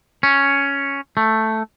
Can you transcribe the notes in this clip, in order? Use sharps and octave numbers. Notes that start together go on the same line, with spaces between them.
C#4
A3